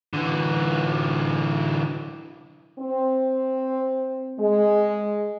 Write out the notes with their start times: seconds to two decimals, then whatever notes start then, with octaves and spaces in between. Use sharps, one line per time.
0.13 D3 E3
2.79 C4
4.39 G#3